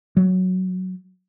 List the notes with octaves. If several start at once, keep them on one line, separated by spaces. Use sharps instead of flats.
F#3